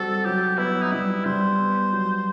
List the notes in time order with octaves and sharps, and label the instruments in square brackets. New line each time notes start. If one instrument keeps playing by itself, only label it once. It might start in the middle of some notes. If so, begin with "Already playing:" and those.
Already playing: [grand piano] G3 C4 F#4 [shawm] A4
[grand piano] F#3 [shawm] G4
[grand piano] B3 [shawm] E4
[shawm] D#4
[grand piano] G3 [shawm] E4
[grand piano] G3 [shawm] C5
[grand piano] B3
F#3